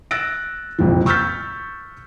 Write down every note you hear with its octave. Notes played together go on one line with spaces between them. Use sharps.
E6 F#6 A6 A#6 D7
F#1 C2 F2 A#2 F3
C#6 E6 F6 G6 A6 B6